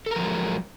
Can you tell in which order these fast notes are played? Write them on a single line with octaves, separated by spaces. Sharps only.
A4 A#4 F3 F#3 G#3